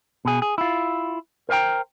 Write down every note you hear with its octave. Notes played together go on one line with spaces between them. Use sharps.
B2 G#4
G#4
E4 F4
A#4 C5 D#5 G5 A#5